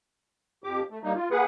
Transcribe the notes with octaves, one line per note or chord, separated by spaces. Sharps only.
F2 G4 D6
A3
G3 A#3 D#4
F4
A#3 G#4 B4 F#5